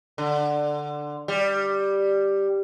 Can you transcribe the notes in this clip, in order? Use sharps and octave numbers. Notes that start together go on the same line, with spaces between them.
D3
G3